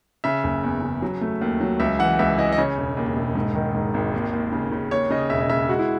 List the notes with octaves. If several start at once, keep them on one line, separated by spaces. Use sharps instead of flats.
C#3 E5
F#1
E2
C#3
F#3
A3
D#2
F#3
C#2 E5
E3 F#5
C#2 E5
E3 D#5
D#5
C#3 C#5
E1
D#2
E1
G#2
D#3
G#2
G#1
D#2
D#2
C#3
C#3
D#2 C#5
C#3 D#5
E1 E5
D#5
C#3 E5
G#3 F#4
E4